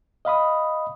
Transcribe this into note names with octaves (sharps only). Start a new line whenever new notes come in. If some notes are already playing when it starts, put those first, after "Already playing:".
D#5 F5 B5 D#6